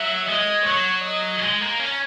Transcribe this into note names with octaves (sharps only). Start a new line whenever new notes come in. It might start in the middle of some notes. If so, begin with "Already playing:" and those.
Already playing: F#3 E5
G#3 D#5
F#3 C#5
D#5
G#3
A#3
C#4